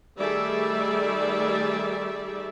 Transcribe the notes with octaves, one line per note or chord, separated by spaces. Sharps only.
D#3 G3 A3 G#4 D5 E5